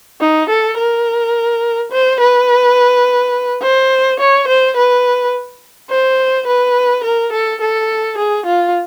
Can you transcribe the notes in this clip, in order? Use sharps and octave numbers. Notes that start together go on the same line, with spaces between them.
D#4
A4
A#4
C5
B4
C5
C#5
C5
B4
C5
B4
A#4
A4
A4
G#4
F4